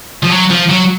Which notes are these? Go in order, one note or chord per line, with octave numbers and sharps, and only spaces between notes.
F3
F#3
F3
F#3